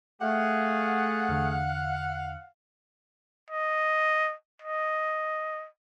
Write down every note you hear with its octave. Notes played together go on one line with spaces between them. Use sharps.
A3 G#4 F5 F#5
E2 D3
D#5
D#5